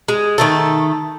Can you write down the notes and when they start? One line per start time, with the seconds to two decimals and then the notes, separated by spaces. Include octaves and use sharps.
0.08 G#3
0.38 D#3 A3 A4